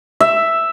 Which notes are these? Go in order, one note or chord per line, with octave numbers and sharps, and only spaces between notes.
E5